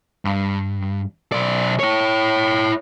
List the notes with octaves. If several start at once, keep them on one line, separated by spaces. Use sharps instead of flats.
G2
B1 D5
E4 C#5